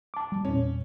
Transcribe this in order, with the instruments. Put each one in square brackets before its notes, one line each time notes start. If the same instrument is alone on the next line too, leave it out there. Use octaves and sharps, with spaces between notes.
[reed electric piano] A5 D6
[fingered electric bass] G3
[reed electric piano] E2 A#2 [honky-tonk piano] C#4